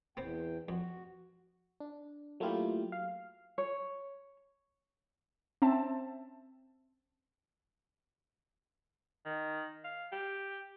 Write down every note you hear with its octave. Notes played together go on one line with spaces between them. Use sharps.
E2 B3 C4 G5
F2 F#4
D4
F#3 A3 A#3 E4 F4 G4
F5
C#5
C4 C#4 E5 A5
D#3
F5
G4